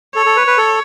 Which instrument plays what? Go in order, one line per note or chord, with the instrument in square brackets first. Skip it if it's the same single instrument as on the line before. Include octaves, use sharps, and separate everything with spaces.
[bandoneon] A4 [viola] C#5
[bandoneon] A4
B4
B4
A4